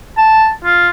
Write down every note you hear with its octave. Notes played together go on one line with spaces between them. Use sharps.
A5
F4